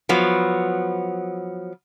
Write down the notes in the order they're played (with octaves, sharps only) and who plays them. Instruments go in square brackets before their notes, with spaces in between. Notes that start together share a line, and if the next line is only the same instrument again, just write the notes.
[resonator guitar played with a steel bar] F3 F#3 B3